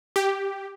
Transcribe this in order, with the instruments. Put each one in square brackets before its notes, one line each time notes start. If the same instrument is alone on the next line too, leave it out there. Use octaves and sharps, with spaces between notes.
[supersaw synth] G4